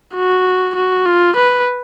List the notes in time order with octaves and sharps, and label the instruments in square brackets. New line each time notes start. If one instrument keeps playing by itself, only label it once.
[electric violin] F#4
F#4
F4
B4